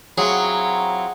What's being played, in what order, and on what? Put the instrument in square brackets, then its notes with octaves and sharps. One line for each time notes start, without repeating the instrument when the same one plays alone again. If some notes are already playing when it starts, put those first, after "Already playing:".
[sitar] F#3 [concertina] C4 E4 F4 [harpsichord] G#4 [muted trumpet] A#5